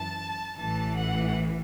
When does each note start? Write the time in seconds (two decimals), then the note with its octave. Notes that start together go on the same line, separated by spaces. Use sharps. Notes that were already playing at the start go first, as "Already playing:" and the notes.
Already playing: F#2 E3 A5
0.58 A1 A2 E3 A5
0.97 F#5